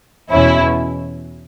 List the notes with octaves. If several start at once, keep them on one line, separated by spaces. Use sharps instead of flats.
E2 B2 C#4 E4